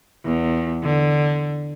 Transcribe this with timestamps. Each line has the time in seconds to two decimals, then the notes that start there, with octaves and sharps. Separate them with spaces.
0.24 E2
0.83 D3